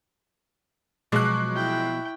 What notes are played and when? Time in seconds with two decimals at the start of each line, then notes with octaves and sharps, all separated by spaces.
1.12 B2 F3 F#3 G#3 C#6 D6 F#6
1.53 E4 G5